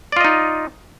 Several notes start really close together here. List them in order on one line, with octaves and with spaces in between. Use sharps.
D5 F4 D#5 D#4